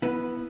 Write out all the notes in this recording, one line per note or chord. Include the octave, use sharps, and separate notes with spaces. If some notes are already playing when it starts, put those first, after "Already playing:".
B3 E4 B4